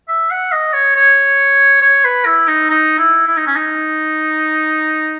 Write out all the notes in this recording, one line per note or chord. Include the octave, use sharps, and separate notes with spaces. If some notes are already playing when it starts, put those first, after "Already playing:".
E5
F#5
D#5
C#5
C#5
C#5
B4
E4
D#4
D#4
E4
E4
D#4
C#4
D#4